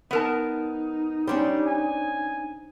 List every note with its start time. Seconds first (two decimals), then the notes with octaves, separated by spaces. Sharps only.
0.11 B3 D#4 A#4 A5
1.27 G3 C#4 D4 C5
1.68 G#5